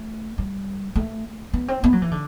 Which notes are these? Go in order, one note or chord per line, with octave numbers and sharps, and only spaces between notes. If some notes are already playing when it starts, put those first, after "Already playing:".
Already playing: A3
G3
A3
B3
C4
B3
F#3
E3
D3